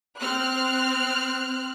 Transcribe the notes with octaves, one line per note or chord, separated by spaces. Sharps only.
C4 F6 F#6